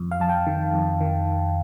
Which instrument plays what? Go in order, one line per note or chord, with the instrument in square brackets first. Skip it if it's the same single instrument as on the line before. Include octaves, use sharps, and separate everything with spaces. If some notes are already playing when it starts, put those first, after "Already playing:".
Already playing: [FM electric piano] F2
F5
F2 A5
G5
D#3
F2
D#3